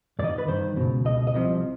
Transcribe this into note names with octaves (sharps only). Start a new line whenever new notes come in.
G2 D5
D#3 D#5
D5
B4
G2 D#3 C5
C#2 B2
C#2 B2 D#5
D#5
C2 C3 F3